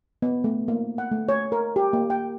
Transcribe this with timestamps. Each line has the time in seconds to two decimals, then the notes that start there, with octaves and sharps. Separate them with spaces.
0.22 B3
0.44 A3
0.68 A#3
0.98 F#5
1.11 A3
1.29 C#5
1.52 A#4
1.76 G4
1.93 A#3
2.10 G5